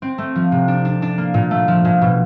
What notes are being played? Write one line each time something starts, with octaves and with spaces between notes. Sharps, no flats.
C4
A3
F3
C3
D4
D4
D4
A#3
A#2
A3
F3
A#2
B2